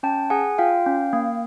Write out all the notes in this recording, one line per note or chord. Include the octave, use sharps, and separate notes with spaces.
C#4 G5 A5
G#4 F#5 G#5
F4 F5 G5
C#4
A#3